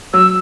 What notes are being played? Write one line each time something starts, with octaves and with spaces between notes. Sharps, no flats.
F#3 E6